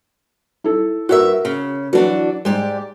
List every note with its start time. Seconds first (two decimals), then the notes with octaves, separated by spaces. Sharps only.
0.64 E4 A4
1.09 G2 F#4 G4 A#4 E5
1.45 C#3
1.93 E3 F#3 D4 F#4
2.45 G#2 G#3 G4 D5